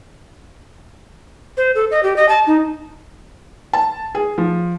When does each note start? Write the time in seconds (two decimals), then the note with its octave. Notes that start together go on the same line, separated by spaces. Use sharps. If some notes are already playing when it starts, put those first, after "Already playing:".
1.57 C5
1.75 A4
1.91 D#5
2.03 G4
2.16 D#5
2.29 A5
2.47 D#4
3.73 A5
4.15 G#4
4.38 F3